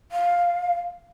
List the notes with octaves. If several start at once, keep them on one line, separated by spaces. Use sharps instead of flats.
F5